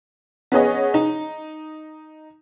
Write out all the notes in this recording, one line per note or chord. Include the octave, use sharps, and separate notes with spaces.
B3 C#4 G#4 D#5
D#4